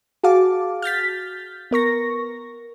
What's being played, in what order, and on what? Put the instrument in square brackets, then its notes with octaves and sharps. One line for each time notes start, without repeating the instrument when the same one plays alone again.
[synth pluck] F#4 G#4 F5 A5 D6
F6 G6 A6 B6
B3 A#4 C#6 A#6